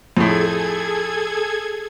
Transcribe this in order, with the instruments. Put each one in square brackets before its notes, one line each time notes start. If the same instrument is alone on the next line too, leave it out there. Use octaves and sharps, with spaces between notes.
[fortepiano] F2 A2 [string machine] G#4 A4 G#6